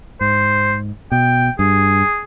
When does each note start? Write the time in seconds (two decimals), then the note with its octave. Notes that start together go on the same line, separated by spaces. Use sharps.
0.21 G#2 C5
1.12 B2 G5
1.59 G2 G#4